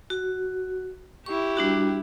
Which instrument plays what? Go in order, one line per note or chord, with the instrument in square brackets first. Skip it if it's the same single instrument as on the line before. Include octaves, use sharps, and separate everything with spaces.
[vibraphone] F#4
[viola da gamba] E4 G4 [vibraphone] C#6
[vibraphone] G3 D4 F#4